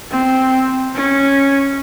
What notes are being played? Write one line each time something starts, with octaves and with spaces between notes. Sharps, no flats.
C4
C#4